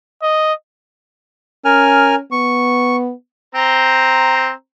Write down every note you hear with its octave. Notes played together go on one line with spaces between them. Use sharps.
D#5
C#4 A#4 G#5 F6
B3 C#6
C4 C5 A#5